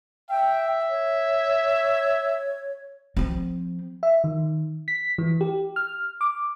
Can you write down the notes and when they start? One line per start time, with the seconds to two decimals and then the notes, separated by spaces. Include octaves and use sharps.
0.30 E5 G5
0.90 C#5
3.17 F3 C4
4.03 E5
4.24 D#3
4.88 B6
5.18 E3
5.41 G4
5.76 F6
6.21 D6